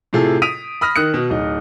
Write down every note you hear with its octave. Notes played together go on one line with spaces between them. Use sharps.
A2 C3 F4 G#4 A4
D#6 B6 D7 D#7 F7
B5 D#6 F6 A#6
D#3 D#6 F#6 C#7
B2
D1 D#4